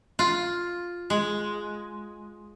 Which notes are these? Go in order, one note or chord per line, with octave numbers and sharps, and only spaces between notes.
F4
G#3